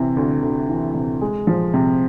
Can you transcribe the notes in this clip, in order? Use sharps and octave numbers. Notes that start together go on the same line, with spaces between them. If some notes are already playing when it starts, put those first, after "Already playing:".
Already playing: C3 E3
D2
D2
E3
C3
G#3
F3
C3